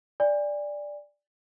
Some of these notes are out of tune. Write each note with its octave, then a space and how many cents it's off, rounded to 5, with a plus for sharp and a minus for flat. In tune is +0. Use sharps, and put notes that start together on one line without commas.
D5 +0 G#5 -40